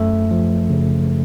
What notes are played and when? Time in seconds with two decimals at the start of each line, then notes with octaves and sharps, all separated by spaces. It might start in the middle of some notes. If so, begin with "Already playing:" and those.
Already playing: F#2 A3 A4
0.31 F3
0.70 C#3